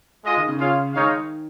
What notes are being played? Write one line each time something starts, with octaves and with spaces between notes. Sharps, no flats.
G#3 F4 G#4 D#5
D#3
C#3
F4 G#4 C#5 F5
D#3 G#3 D#4 C#5 F5